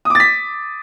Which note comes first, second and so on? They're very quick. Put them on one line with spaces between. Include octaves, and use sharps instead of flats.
D#6 D6 A6 B6